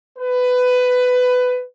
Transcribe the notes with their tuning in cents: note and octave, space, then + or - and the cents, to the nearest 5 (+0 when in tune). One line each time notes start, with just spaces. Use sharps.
B4 +15